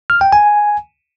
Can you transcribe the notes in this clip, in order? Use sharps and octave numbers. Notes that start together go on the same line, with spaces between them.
F6
G5
G#5